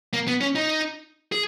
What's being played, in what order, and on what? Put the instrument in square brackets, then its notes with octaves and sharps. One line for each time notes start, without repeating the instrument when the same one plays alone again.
[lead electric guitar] A#3
B3
C#4
D#4
G#4